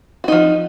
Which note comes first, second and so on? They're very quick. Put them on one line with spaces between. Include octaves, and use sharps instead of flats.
F#4 D#4 F3